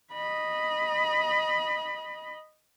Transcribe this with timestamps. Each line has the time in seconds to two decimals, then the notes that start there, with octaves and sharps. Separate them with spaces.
0.12 D#5 B5